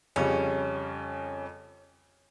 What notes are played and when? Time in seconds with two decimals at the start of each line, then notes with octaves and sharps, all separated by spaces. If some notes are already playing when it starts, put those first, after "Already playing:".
0.16 F2 C#3 G3 C#4